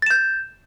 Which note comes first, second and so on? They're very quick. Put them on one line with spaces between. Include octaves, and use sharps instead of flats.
A6 E7 G6